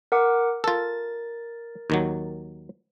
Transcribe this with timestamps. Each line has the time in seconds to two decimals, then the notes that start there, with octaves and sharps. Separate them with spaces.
0.12 A#4 F#5 D6
0.64 F4 A4 A#4 A6
1.90 D#2 D#3 F#3